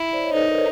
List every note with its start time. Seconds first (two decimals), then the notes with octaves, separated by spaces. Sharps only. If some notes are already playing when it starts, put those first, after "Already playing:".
Already playing: E4
0.13 C5 D5
0.24 C#5 D#5
0.33 D#4 A4 B4
0.49 A#4 C5